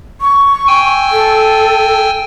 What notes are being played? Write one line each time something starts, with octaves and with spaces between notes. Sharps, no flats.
C#6
G5 G#5 E6
A4